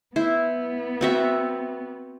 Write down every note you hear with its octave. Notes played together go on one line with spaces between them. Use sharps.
B3 E4 C5
C4 F#4 E5